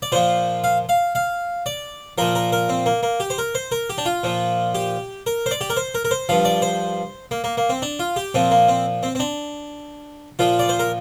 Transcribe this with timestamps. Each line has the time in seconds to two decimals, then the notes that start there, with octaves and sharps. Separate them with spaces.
0.02 D5
0.12 A#2 F3 C5
0.64 F5
0.89 F5
1.15 F5
1.66 D5
2.18 A#2 F3 A#4
2.35 A#4
2.52 A#4
2.69 C4
2.86 A#3
3.03 A#3
3.20 G4
3.30 C5
3.38 A#4
3.55 C5
3.72 A#4
3.90 G4
3.98 D4
4.06 F4
4.23 A#2 F3
4.75 G4
5.26 A#4
5.46 C5
5.51 D5
5.61 G4
5.70 A#4
5.77 C5
5.95 A#4
6.05 A#4
6.11 C5
6.29 G2 F3 F5
6.45 D5
6.62 C5
7.31 A#3
7.44 A#3
7.57 A#3
7.70 C4
7.82 D4
7.99 F4
8.16 G4
8.34 A#2 F3 C4
8.51 A#3
8.68 C4
9.03 C4
9.15 C4
9.20 D4
10.39 A#2 F3 F4
10.59 D5
10.69 C5
10.79 A#4